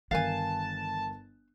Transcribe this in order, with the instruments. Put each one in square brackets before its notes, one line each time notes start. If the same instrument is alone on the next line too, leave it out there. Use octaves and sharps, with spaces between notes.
[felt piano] G1 A#4 F#6 [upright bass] D#3 E3 [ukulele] F5 G#5 [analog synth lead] A5